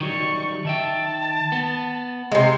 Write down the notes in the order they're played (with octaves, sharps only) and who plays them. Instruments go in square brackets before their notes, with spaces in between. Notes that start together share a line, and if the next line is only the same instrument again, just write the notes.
[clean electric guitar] D#3 F#3 G3 [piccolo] C#6
[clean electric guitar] D#3 E5 G5 [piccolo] A5
[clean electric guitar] B3
[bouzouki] C3 G#3 [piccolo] C6